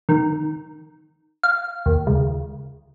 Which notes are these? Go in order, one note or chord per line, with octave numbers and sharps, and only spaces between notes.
D#3
F5
D#2
C#2